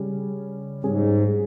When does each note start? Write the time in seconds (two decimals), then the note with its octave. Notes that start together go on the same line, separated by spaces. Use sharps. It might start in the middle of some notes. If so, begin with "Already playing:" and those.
Already playing: C#3 G3 C#4 G#4
0.84 G#2 G3 C#4 G#4